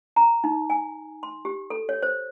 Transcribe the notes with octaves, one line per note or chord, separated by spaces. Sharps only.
A#5
D#4
G#5
C6
G4
A4
C#5
C5